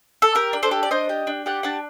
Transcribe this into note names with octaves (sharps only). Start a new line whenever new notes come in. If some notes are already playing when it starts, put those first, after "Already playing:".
A4
G4 A#4
D4
A4 C5
G4
D5
D4 C5 D#5
G4
D4
G4 D5 F#5
D4 F#5 A5